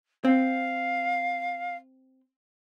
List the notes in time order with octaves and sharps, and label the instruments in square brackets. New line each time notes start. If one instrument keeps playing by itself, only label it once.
[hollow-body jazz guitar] C4 [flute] F5